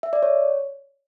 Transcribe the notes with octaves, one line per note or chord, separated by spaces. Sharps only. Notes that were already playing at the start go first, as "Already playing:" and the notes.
E5
D5
C#5